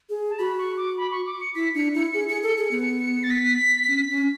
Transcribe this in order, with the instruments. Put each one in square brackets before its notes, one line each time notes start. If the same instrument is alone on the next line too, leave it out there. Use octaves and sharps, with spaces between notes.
[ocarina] G#4
[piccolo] A5
[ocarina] F#4 [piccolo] B5
[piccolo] C#6
D6
B5
C#6
D6
C#7
[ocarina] E4 [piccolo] B6
[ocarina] D4 [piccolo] C#7
[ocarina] E4 [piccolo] C#7
[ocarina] G#4 [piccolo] C#7
[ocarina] G#4 [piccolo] C#7
[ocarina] A4 [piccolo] C#7
[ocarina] G#4
[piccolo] C#7
[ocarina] B3
[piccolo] C#7
C#7
A6
B6
[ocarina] C#4
C#4